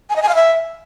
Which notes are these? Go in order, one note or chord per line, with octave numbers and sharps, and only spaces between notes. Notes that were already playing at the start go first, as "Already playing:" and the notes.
G#5
D#5
G#5
F5
E5